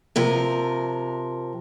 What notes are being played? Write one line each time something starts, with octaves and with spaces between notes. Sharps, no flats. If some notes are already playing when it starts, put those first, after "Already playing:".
C3 F3 A#4